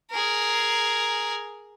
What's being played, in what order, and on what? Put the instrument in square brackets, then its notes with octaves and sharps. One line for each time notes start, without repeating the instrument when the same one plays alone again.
[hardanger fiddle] G#4 A#4